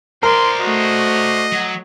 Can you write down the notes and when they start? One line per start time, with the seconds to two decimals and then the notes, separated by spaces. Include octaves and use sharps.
0.23 A#4 C5 D5 C6
0.61 A3 F#4 D#5
1.52 F#3